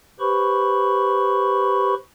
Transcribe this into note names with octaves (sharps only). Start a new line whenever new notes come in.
G4 B4 C5 B5 C#6